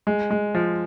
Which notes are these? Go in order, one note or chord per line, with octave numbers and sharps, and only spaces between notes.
G#3
G#3
F3